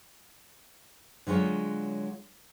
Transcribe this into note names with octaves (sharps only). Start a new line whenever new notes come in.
D3 F#3 G#3 F4 C#5